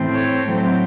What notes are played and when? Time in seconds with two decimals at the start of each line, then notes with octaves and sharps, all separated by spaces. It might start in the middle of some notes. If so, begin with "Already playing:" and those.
Already playing: A2 E3 A3 C4
0.13 A4 C#5
0.47 A2 F#3 A3 C4